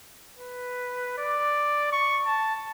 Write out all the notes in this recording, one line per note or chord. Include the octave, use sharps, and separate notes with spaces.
B4
D5
C#6
A5